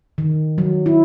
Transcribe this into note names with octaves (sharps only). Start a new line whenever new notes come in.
D#3
F#3
E4